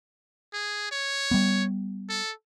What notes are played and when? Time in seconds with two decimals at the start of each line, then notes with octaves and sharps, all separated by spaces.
0.54 G#4
0.92 C#5
1.31 G3 B3
2.09 A4